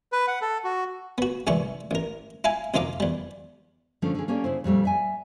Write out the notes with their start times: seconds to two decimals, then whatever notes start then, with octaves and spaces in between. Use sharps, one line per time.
0.12 B4
0.28 F#5
0.42 A4
0.64 F#4
1.18 B3 F#4
1.47 C2 G#2 E3 G3 C#6
1.91 A1 A#4
2.44 E4 F5 G#5
2.74 C2 F2 D#4 F5 D6
3.00 E2 G3
4.02 D3 F3 A3 C#4
4.15 D3 G#4
4.28 A#3 C#4 G4 A4 D5
4.44 C#3 E4 C5
4.64 F2 A#2 G3 A3
4.83 D5 E5 G#5